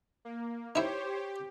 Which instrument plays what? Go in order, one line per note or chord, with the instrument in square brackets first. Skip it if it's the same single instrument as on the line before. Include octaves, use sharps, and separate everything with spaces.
[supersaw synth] A#3
[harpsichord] D#4 E4 [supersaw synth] G4 C5 C#5
[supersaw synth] G4